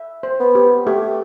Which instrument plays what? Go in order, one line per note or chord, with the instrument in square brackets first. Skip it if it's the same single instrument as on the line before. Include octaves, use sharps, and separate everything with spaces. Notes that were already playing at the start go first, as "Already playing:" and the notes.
Already playing: [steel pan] E5
C5
[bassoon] B3
[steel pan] G4
[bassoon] A3 [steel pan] G4